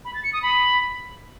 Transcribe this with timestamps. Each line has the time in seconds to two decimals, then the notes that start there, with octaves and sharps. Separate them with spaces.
0.05 B5
0.14 A6
0.24 C#7
0.33 D#6
0.42 B5